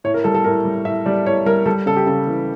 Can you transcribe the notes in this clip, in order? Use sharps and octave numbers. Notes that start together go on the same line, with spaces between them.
A2 C#5
A#4
G3 A4
A4
A2 A#4
G3
A2 E5
G3 D5
A2 C#5
G3 A#4
G3 A4
C#3 A4
G4
C#3 A4
E3